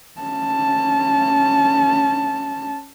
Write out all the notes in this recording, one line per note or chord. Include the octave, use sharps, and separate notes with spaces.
C#4 A5